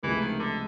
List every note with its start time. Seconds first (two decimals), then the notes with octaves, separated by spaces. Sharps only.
0.03 C#2 C3 E3 F3 A3
0.21 D#3
0.39 D3